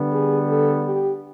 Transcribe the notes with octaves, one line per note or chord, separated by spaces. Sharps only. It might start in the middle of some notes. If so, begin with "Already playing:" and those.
Already playing: D3 G3 B3
G#4
A4
G4